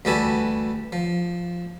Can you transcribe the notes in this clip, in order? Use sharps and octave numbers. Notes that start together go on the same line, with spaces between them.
D2 E3 G3 F#4 A4 G#5
F3